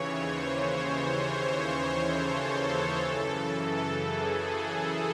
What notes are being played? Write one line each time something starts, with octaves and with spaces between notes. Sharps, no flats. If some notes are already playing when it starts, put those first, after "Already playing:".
Already playing: D#2 C#3 E3 C#5
C5
C5
C#5
A4
F#2 C#3 E3
G#4